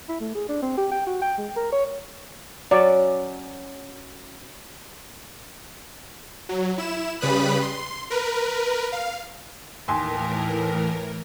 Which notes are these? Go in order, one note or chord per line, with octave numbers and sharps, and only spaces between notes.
E4
A3
G#4
D4
C4
G4
G5
F#4
G5
G#3
A#4
C#5
F#3 C#4 D5
F#3
E4 E7
C#3 G3 B4 B5 D#6 F#6
C6
A#4 B4
F5
D#2 A2 E3 A#4 G#5 C6